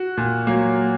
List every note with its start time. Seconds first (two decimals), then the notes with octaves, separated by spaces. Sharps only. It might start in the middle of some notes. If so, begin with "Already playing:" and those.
Already playing: F#4
0.17 A#2
0.47 F#3 A#3